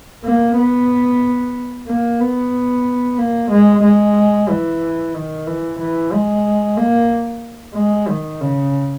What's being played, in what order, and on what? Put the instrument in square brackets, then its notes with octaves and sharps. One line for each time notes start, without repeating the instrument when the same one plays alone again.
[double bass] A#3
B3
A#3
B3
A#3
G#3
G#3
E3
D#3
E3
E3
G#3
A#3
G#3
D#3
C#3